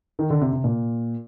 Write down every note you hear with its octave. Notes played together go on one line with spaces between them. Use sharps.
D#3
D3
C3
C3
A#2